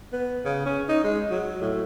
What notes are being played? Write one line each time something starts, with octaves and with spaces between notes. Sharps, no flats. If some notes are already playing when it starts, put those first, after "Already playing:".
B3
C#3
C#4
D#4
G#3
F#3
A2